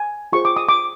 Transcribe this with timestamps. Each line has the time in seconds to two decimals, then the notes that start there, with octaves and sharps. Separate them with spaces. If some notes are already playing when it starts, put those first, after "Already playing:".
Already playing: G#5
0.32 F4 G#4 C5 C#6
0.45 D6
0.57 D#6
0.69 D6